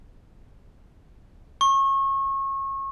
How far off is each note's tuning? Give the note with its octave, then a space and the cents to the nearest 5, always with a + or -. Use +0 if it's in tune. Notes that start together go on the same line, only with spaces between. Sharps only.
C#6 -30